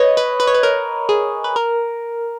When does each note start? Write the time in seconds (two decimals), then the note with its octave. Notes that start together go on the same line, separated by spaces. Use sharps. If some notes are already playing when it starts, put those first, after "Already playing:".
Already playing: B4 C#5 D#5
0.17 B4
0.40 B4
0.47 C#5
0.54 B4
0.63 A#4
1.09 G#4
1.44 B4
1.56 A#4